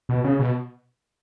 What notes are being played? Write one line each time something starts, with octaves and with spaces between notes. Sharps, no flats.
B2
C#3
B2